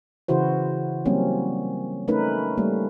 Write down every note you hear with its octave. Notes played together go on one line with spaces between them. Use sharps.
C#3 E3 E4 F#4 C5
F#3 G3 A#3 C4 C#4
A3 C#4 D#4 A#4 B4
G3 A3 A#3